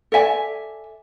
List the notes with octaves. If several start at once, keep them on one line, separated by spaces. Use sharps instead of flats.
A4 D5 E5 G#5